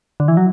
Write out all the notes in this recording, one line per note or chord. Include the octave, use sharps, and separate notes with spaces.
D3
E3
F#3